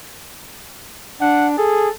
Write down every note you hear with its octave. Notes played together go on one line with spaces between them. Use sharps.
D4 F#5
G#4 A4